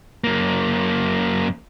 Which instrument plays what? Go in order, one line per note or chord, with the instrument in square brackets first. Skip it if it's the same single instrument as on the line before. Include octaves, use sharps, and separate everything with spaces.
[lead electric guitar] F#2 A#3